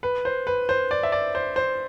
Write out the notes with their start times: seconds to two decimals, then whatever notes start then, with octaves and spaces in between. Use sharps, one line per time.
0.03 B4
0.25 C5
0.47 B4
0.69 C5
0.91 D5
1.03 E5
1.12 D5
1.35 C5
1.56 C5